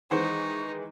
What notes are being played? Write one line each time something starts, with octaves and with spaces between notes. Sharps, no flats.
D#3 E3 G#3 D#4 C5 F#5 C#6